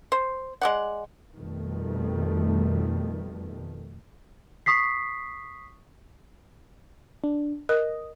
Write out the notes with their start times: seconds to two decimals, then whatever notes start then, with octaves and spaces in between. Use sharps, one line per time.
0.12 C5
0.61 G#3 D5 F#5
1.36 F2 B2 D#3 G3 A3
4.66 C#6 D#6 B6 C7
7.24 D4
7.69 A#4 D#5